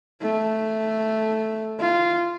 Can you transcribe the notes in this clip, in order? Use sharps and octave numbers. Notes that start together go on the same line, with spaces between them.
A3
F4